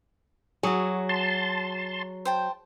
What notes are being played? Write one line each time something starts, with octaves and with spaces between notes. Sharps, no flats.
F#3 F#4 G#4
A5 C6
C5 G5 A5